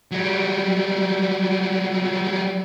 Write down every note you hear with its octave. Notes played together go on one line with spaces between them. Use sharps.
F#3 G3